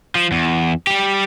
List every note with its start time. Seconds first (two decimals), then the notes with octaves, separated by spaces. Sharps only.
0.15 F3
0.32 E2
0.87 G3 G4